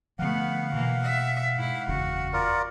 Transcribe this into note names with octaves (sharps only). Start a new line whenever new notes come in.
D3 F3 A3 B3 F5 F#5
B2 E3 A#3
E5
G#2 E4
F#1 E2 C#3 F#4
F4 A#4 D5